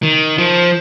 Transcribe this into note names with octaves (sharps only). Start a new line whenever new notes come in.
D#3
F3